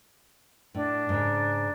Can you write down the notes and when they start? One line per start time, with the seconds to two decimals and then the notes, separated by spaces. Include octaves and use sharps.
0.75 A2 D4
1.09 G#2 C#3